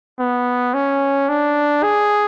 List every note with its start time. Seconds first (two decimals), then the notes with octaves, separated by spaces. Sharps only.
0.19 B3
0.74 C#4
1.29 D4
1.83 G#4